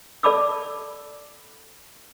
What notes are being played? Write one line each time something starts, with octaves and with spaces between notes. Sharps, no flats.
A4 D5 A5 B5 D6 E6